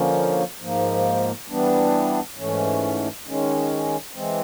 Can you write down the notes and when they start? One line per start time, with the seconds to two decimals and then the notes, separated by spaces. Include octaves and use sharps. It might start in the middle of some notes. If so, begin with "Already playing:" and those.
Already playing: D3 F3 A#3 C#4
0.61 G#2 F3 A#3
1.50 E3 G3 B3 D4
2.37 G#2 E3 A3 C#4
3.26 D#3 G#3 C#4
4.14 E3 G#3 C4